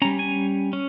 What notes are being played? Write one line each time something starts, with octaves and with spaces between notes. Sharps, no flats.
G3 C#4 A#5
G#5
C#4